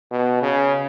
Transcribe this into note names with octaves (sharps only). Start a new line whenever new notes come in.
B2
C#3